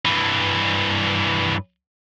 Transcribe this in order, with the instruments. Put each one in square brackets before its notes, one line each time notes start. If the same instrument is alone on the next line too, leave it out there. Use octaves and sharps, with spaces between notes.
[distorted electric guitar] G2 E3